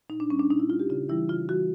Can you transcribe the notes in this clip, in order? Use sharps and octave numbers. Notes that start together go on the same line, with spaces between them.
A#2 D#4
D4
G3 C#4
D4
A#2 D#4
E4
G3 F4
G4
C#3 F4
E3 G3 E4
C#3 F4
E3 G3 F#4